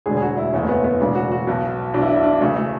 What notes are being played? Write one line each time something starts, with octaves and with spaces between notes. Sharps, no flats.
E1 D2 D3 G#4
G#4
F#4
E4
F#1 E2 C#3 C#4
A3
B3
B3
E1 D2 C#3 E3 D4
F#4
F#4
B1 B2
B1 B2 D4 E4
D4
E4
D4
D2 C#3 E3 A3
A3